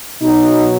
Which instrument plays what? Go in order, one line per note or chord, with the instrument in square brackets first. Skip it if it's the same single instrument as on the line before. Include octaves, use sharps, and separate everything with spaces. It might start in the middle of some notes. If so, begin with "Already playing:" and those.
[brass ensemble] B2 F#3 D#4